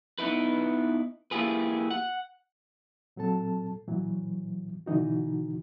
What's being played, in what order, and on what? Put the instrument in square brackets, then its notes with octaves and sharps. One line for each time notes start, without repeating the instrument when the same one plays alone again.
[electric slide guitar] B3 D#4 E4 B4
A#3 E4 F4 G4 G#4 B4
F#5
[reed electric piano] A#2 F#3 C4 A4 A5
A#2 E3 F#3
B2 D3 E3 D#4 F#4